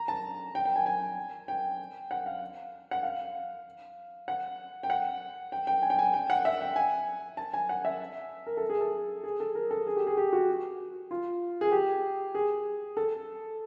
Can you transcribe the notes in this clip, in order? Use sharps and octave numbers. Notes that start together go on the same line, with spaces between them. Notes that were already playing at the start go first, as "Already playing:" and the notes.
Already playing: A#5
A5
G5
G5
G#5
G#5
G5
F#5
F5
F#5
F5
F#5
G5
F#5
G5
G5
G#5
G5
G#5
G5
F#5
E5
G5
G#5
A5
G#5
F#5
E5
A#4
A4
G#4
A4
G#4
A4
A#4
A4
G#4
G4
G#4
G4
F#4
F4
G#4
G4
G#4
A4